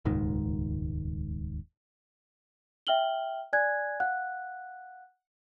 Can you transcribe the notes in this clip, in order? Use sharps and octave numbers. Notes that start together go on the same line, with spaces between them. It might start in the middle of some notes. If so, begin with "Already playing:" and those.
D#1 C#2 G#2 D#3
E5 G5 F6 F#7 G7
D5 G#5 F#6 G#6
F5 F#5 F#6